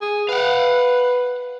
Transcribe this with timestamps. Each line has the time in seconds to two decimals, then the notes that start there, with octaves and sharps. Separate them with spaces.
0.01 G#4
0.29 B4 F5 F#5